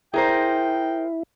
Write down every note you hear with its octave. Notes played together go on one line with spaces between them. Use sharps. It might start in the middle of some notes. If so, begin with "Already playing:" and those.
E4 G#4 A#4 C5 G5